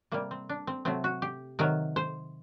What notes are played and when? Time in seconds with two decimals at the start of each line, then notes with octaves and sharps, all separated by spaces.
0.11 C3 G3 A#3
0.31 C4
0.49 D4
0.67 C4
0.85 C3 F#3 A3 C4
1.04 F#4
1.22 G4
1.59 C3 D#3 F#3 A#4
1.96 C5